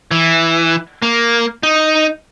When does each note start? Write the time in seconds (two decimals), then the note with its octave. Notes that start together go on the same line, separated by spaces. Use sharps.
0.11 E3
1.02 A#3
1.63 D#4